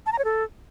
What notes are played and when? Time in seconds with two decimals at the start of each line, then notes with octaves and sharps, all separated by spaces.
0.06 A5
0.12 A#5
0.18 C#5
0.25 A4